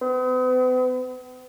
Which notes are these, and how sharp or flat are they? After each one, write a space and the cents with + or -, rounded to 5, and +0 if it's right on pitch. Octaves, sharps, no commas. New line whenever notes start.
B3 +45